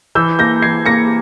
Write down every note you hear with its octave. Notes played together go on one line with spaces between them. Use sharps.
E3 E6 G6
A#3 G6 A#6
E3 G#6 C7
A#3 A#6 C#7